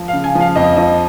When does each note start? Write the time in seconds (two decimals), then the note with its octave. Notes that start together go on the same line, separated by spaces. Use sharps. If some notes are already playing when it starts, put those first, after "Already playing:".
Already playing: F3
0.08 F5
0.13 C#3
0.24 G#5
0.35 F3
0.40 F5
0.55 F2 D#5
0.77 F3 D#5